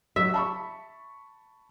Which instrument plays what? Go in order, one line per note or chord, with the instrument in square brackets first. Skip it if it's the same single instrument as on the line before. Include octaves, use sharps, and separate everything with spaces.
[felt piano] F#3 [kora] E5
[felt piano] A5 B5 C#6